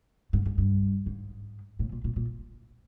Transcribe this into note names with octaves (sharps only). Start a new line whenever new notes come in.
G#2
G#2
G2
G#2
A2
A#2
A#2
A#2